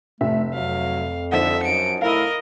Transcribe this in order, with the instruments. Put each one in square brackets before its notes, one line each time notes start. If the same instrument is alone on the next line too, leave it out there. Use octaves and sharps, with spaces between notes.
[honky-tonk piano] F1 E5 [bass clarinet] A3
[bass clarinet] F2 [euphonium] F#3 [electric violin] F5
[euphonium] D3 [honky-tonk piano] F3 D#4 F#5 [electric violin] E5
[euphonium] F#2 [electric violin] C#7 D7
[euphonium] A2 [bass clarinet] E4 [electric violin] A#4 D#5 [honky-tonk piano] F5